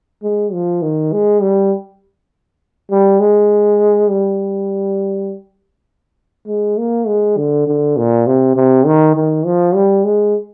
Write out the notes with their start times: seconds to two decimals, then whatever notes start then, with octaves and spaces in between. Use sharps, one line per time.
0.23 G#3
0.53 F3
0.82 D#3
1.12 G#3
1.42 G3
2.91 G3
3.20 G#3
4.10 G3
6.47 G#3
6.77 A#3
7.07 G#3
7.37 D3
7.67 D3
7.97 A#2
8.27 C3
8.56 C3
8.86 D#3
9.16 D#3
9.45 F3
9.75 G3
10.05 G#3